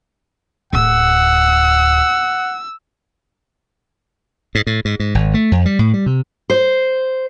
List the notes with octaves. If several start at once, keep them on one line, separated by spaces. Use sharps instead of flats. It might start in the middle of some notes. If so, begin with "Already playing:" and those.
D1 F#5 E6
G#2
A2
G#2
G#2
G#1
A3
F2
G3
A2
G3
C3
C5